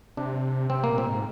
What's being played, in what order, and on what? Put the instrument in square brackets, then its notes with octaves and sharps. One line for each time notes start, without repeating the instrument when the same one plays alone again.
[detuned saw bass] C3 [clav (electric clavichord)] D4
[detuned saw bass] C3 [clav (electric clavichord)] C4
[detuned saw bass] A#2 [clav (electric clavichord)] A#3
[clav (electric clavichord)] C4
[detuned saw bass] G#2